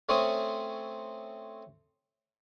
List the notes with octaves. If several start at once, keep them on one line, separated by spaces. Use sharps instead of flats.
A3 C4 C#4 C#5 C#6 D#6